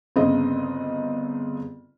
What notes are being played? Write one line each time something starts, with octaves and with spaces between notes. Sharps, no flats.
G1 C#3 C4 D#5